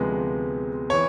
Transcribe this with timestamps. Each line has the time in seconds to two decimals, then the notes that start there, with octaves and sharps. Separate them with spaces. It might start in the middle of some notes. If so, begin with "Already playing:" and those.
Already playing: D2 C3 F3 G#3 B3
0.90 E3 C#5